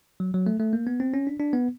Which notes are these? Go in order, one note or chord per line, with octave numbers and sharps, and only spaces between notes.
F#3
F#3
A3
A3
A#3
B3
C4
C#4
D4
D4
B3